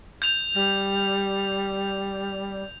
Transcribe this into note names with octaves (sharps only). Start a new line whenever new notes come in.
G6 F7
G3